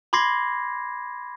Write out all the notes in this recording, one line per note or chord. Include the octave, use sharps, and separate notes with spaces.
B5 C6 D6 G#6 A#6 C7